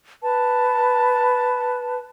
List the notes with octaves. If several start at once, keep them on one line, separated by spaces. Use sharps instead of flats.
B4 A5